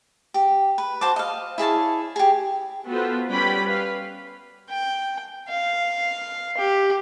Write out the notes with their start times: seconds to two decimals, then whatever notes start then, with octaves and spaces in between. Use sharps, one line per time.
0.34 G4
0.78 B4
1.01 F#4 C5 A5 D6
1.16 D#5 F5
1.58 E4 G#4 C#5 A5
2.16 G4 G#4
2.86 B3 F4 F#4 A4 B4 C5
3.29 G3 C#4 B4 D5 G5 B5
3.66 B4 F5
4.69 G5
5.49 F5
6.58 G4